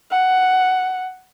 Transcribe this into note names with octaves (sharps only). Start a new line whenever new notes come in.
F#5